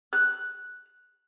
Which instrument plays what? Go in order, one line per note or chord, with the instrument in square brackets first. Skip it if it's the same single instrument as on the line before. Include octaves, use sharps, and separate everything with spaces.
[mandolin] F#6